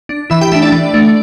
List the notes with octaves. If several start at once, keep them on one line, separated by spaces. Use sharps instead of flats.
D4
E3 E4 E5
G4 G5
A3 D4 E4 E5
D4 D5
E3
A3 D4